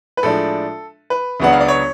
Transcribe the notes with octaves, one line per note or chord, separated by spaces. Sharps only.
B4
A2 F3 G#3 D4 A4
B4
C#2 C#3 F#3 B3 D4 F#5
F5
D5
C#5